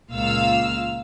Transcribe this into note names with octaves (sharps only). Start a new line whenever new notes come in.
C#2 A#2 F5 E6